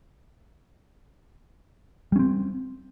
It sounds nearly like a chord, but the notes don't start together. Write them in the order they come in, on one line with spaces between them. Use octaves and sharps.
G3 C#4 C4